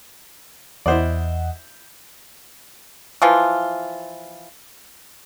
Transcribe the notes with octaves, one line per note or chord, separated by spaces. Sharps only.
E2 E4 C5 D5 D#5 F#5
E3 F3 F4